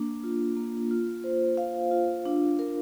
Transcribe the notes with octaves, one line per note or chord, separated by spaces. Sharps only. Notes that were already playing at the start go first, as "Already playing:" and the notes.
Already playing: A#3 D4
F4
A#3
F4
C5
F5
F4
D4
A#4